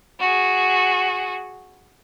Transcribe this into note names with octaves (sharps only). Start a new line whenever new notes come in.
F#4 G#4